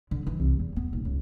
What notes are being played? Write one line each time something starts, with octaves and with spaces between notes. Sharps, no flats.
D3
E3
C2
E2
B3
D#1
C#2